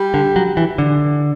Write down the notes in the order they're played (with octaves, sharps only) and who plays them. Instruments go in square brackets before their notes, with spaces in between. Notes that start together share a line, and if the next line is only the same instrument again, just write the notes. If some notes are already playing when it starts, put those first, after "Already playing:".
Already playing: [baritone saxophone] G3
[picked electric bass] D3
F#3
E3
D3